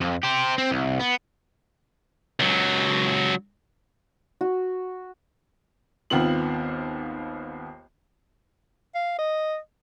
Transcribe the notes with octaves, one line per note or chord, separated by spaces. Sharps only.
F2
G4 C5
C4
C2
B3
C#2 F#3
F#4
G#1 D#2 B3 C4 F4 F#7
F5
D#5